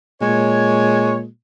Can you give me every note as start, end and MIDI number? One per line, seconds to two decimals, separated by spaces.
0.22 1.26 46
0.22 1.27 56
0.22 1.18 73